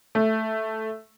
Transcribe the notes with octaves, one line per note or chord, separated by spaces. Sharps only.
A3